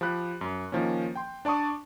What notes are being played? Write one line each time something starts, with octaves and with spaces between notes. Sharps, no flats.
F3 G4 B5 F#6
F#2
D#3 F3 A#3 C#4
G5 C6
D4 D5 A5 C#6 D#6